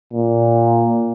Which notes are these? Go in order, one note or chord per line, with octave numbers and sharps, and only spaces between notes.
A#2